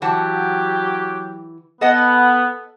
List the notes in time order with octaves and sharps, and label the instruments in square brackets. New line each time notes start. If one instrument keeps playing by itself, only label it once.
[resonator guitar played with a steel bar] E3 F#5 A5 [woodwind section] F#3 G4
[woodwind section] B3 [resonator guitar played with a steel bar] A4 D#5 F#5